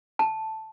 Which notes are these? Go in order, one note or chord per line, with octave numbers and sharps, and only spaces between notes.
A5